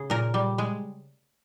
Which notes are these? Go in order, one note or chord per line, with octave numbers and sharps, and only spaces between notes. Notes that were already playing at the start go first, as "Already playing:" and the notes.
Already playing: C#3 G#4
A#2 A#4
G3
G#3